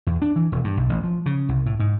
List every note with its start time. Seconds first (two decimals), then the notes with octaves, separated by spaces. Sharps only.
0.07 E2
0.22 D4
0.36 E3
0.52 E1
0.64 G2
0.77 B1
0.89 A1
1.04 F3
1.26 C#3
1.49 C2
1.66 A2
1.80 G#2